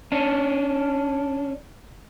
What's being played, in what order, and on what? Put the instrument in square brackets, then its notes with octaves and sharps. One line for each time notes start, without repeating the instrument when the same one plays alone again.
[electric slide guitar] C#4 D4